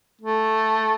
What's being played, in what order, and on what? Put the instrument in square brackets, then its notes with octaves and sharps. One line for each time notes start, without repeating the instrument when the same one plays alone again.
[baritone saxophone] A3